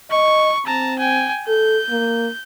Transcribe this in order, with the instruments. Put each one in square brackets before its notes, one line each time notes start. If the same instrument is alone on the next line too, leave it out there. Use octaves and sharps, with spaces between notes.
[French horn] D#5 [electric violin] C#6
[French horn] C4 [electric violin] A5 A#5
[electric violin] G5 G#5
[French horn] A4 [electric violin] G6
[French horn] A#3